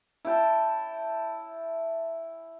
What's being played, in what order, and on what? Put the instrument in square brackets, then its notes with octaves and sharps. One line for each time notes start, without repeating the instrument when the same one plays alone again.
[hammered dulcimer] E4 C#5 G5 A5